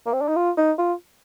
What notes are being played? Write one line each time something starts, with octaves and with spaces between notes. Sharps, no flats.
A#3
C4
D4
D#4
F4
D#4
F4